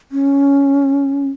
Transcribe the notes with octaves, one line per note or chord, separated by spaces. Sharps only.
C#4